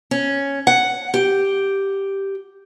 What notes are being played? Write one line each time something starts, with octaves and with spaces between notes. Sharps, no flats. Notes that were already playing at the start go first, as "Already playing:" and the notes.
C#4
F#5
G4